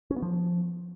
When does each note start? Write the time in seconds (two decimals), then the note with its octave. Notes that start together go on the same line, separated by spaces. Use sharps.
0.11 C#4
0.16 B3
0.22 F3